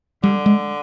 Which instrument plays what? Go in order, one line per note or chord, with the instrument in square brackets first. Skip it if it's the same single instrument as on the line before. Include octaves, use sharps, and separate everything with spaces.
[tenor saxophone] D3 [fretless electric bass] G3
[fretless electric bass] G#3